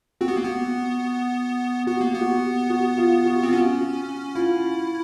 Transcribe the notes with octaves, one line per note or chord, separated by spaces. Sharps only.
C4 F#4
B3
A#3
B3
B3 F#4
A#3
B3
F#4
G4
F#4
F4
F#4
C4
F4
C#4 F#4
E4 F4